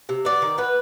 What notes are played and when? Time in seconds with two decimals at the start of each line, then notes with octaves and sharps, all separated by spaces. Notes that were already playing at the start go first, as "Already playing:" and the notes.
0.09 C3
0.25 B3 D5
0.42 D#3
0.58 B3 B4